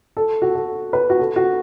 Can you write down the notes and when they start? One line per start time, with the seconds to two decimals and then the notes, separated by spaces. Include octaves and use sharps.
0.17 A4
0.42 F#4
0.55 A4
0.93 B4
1.10 F#4
1.20 A4
1.36 F#4